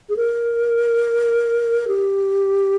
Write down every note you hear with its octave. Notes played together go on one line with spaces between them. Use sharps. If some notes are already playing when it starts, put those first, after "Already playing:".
G#4
A#4
G4